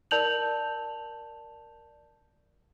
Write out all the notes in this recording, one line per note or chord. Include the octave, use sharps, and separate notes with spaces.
A#4 D5 A5 G6 F7 F#7